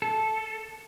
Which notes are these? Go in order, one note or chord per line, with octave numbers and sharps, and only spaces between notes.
A4